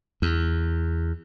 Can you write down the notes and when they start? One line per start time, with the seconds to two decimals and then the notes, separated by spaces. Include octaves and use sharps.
0.22 E2